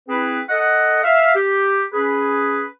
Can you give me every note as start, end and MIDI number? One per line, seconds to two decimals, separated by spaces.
0.08 0.40 60
0.08 0.40 64
0.08 0.40 68
0.08 0.40 71
0.49 1.00 69
0.49 1.00 75
0.49 1.00 78
1.03 1.33 76
1.03 1.33 77
1.35 1.83 67
1.93 2.65 61
1.93 2.65 68
1.93 2.65 71